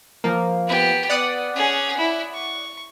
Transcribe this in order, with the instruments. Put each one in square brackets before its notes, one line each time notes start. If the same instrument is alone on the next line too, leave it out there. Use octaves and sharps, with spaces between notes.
[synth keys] F3 A#3
[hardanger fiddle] B3 G4
[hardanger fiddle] B3 [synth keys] D5 F#5 D#6
[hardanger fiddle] C#4 G#4
E4
C#6